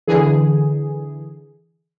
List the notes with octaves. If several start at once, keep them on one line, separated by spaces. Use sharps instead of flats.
D3 E3 G#4